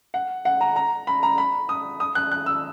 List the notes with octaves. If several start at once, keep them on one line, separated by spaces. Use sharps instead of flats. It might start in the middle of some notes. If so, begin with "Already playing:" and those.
F#5
F#5
A#5
A#5
B5
A#5
B5
D#6
D#6
F#6
F#6
E6